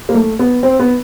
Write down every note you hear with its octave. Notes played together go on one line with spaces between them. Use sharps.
A#3
A3
B3
C4
B3